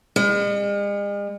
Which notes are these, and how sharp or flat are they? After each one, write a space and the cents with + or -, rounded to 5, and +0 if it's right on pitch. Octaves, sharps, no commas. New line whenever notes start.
G#3 -45